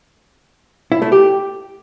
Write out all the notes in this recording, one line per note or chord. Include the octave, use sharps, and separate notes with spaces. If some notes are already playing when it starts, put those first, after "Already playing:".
E4
A3
G4